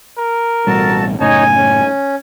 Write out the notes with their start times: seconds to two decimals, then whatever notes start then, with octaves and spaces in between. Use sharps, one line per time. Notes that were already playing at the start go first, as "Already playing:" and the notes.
0.18 A#4
0.67 A1 B2 G3 F#4 A4 A5
1.20 F#2 A2 C#3 D#4 C#5 G#5
1.56 C#4